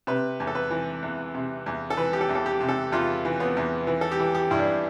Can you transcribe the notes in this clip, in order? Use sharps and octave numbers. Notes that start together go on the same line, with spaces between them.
C3 B4
E2
A4
B4
E3
E2
C3
E2
A4
E3 B4
G4
A4
E2
A4
G4
C3
A4
E2 F4
E3
B3
E2
E3
A4
G4
E3
G4
G2 E4
D4